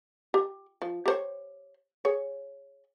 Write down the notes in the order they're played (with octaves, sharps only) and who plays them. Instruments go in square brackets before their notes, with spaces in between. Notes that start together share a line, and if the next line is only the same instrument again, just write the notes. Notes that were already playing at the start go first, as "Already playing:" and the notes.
[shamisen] G4
F3
G4 C5 C#5
G#4 C#5